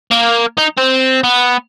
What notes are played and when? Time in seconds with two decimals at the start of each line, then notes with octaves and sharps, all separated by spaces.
0.11 A#3
0.58 D#4
0.77 C4
1.24 B3